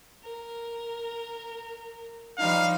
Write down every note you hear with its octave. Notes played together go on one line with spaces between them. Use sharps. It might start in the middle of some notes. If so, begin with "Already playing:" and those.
A#4
F3 G3 D#4 F5